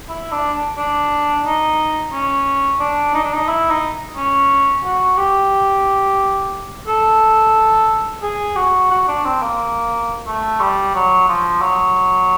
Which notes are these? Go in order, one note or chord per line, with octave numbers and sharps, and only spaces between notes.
E4
D4
D4
D#4
C#4
D4
D#4
D4
D#4
E4
D#4
C#4
F#4
G4
A4
G#4
F#4
F#4
D4
C4
A#3
A3
G3
F#3
F3
F#3